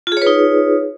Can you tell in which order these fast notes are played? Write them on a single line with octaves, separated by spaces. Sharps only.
F4 G#4 C#5 B4 D#4